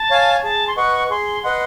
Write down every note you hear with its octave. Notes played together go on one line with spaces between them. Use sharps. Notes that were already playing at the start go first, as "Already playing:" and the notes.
Already playing: A5
C#5 F5 G#5
G#4 A5
C6
B4 D#5 F#5 C#6
G#4 C6
B4 D#5 F#5 C6